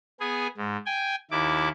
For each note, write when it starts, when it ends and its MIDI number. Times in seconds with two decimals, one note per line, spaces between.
0.20 0.47 59
0.20 0.47 68
0.20 0.47 80
0.57 0.77 44
0.86 1.15 79
0.86 1.15 80
1.31 1.68 39
1.31 1.68 64
1.31 1.68 86